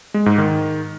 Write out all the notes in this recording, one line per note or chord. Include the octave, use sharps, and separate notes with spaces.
G#3
G#2
D#3